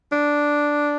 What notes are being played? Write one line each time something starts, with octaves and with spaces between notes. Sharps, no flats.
D4